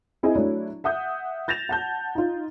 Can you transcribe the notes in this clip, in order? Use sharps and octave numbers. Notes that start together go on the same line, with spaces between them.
C4 E4 G#4 D#5 G#5
F#3 A3 D4 E4
E5 F#5 D#6 G6
G6 A6 A#6 E7 F7
F#5 A5 G6
D#4 F4